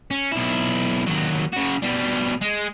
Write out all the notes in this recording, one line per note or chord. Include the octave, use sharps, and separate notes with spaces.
C#4
B1 E4
D#2 F#3
C#3 F#4
B2 G3
G#3